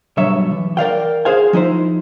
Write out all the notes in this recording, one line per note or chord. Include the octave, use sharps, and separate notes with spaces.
B1 G2 F#3 C#5 E5
E3
A#4 D5 F5 G5
G#4 C5 F5 G#5
F3 D#4 E4 C5